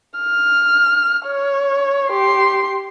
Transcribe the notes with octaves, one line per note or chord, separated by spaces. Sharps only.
F6
C#5
G4 C6